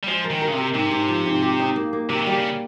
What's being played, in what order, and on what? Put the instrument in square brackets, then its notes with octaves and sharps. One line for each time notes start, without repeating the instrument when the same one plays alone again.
[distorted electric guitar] G3
[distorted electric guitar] F3 [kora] G#3
[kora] A#4
[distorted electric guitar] D#3
[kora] A#4
[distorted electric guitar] C#3
C3
[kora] A#4
[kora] G#2 [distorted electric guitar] C3
[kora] G#2
F3
G#2
G4
D#4
A#3
A#3
[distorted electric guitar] C3 [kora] A#3
[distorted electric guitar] D#3
[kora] G3
[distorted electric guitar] C#3